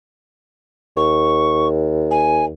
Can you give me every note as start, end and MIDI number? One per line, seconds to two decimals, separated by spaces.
0.97 2.51 39
0.97 1.68 85
2.11 2.45 80